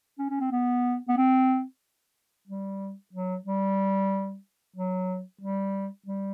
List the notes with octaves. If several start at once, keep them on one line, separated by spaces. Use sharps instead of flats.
C#4
C#4
C4
B3
B3
C4
G3
F#3
G3
F#3
G3
G3